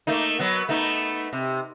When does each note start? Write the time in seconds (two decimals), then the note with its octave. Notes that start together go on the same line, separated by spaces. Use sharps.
0.07 A3 A#3 D#4
0.39 F#3 B3
0.69 A3 B3 D#4
1.33 C3